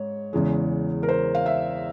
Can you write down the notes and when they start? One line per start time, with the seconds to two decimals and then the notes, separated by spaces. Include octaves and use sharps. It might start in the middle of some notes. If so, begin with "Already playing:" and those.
Already playing: G#2 C#5
0.33 E2 C#3 E3 G#3
1.03 A#4
1.09 C5
1.35 F5
1.46 E5